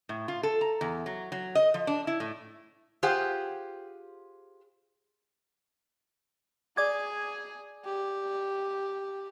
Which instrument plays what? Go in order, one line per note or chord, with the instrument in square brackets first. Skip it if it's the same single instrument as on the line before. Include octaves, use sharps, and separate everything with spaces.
[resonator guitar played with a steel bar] A2
F4
A4
A#5
E2
F#3
F#3
D#5
F3
D4
E4
A2
F4 G4 G#4 C5 F#5
[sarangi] G#4 [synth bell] D5 D6 G#6
[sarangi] G4